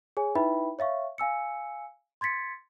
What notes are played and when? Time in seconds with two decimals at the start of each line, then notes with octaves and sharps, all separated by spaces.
0.17 G#4 C#5 G#5
0.35 D#4 E4 B4 E5 G5 B5
0.79 C#5 E5 F5 C#6
1.18 F5 G#5 E6 C#7
2.21 C6 G#6 A6 B6 C#7